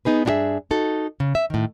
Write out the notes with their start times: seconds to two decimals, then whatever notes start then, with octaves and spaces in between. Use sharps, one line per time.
0.05 B3 D#4 G#4 B4
0.25 G2 D4 E4 G4 G#4 E5
0.71 D#4 F#4 A4
1.20 C#3
1.35 E5
1.50 A2 D#3